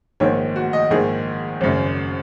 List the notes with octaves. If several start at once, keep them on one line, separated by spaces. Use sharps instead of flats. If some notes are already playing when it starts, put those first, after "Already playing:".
A#1 G#2 D#3 C#5
F#4
D#5
A#1 G#2 D#3 G#4
G#1 F#2 C#3